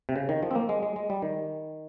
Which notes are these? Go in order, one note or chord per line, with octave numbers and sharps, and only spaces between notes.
C3
C#3
D#3
F3
C4
A#3
G#3
G#3
G#3
G3
D#3